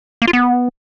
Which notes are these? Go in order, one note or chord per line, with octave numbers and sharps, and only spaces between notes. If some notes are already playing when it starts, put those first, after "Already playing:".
A#3
F4
B3